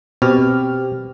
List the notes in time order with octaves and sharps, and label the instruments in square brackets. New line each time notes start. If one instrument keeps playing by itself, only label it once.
[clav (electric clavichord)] B2 [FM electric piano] C4 G4 F6